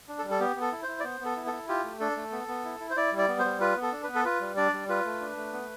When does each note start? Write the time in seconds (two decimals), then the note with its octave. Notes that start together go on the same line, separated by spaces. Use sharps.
0.08 D4
0.19 A4
0.24 G3
0.31 A4
0.40 B3 G4
0.56 B3
0.61 A4
0.72 E4
0.83 E4 C5
1.00 D5
1.04 B3 C5
1.20 B3
1.25 A4
1.36 E4
1.47 A4
1.52 E4
1.68 F4 G4
1.84 A3
2.00 D4 A4
2.16 A3
2.32 B3
2.48 B3
2.65 E4
2.80 E4
2.90 C5
2.97 E4 D5
3.12 G3
3.18 D5
3.28 B3
3.39 C5
3.44 G3
3.60 F4 B4
3.77 B3
3.82 A4
3.92 D4
4.03 B3 B4
4.15 A4
4.25 F4 B4
4.41 G3
4.57 D4 D5
4.73 G3
4.89 F4 B4
5.05 A3
5.21 D4
5.37 A3
5.53 B3